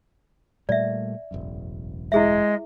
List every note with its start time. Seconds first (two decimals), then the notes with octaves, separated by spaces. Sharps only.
0.69 A#2 G3 A3 D5 E5
1.31 E1 A1 F#2
2.12 G#3 E4 G#4 E5